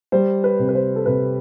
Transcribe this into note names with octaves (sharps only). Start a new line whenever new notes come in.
G3 C5
B4
C3
B4
C5
A4
C3 B4